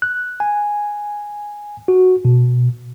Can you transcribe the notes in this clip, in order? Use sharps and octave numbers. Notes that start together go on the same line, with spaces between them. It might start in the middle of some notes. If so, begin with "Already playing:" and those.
F#6
G#5
F#4
B2